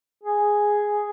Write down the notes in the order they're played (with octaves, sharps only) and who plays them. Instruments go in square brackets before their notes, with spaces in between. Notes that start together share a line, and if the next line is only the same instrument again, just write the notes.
[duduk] G#4